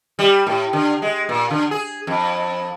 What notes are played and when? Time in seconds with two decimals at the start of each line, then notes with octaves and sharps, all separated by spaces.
0.19 G3
0.47 A2
0.73 D3
1.02 G#3
1.29 A#2
1.50 D3
1.71 G#4
2.07 F2